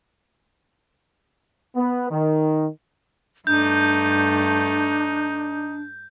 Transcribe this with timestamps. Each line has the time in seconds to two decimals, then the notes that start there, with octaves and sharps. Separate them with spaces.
1.76 B3
2.11 D#3
3.47 G2 A3 D4 D#4 G6